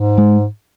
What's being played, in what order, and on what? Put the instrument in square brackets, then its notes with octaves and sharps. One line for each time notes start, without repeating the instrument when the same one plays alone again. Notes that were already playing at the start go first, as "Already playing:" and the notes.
Already playing: [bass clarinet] G#2
[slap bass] G#3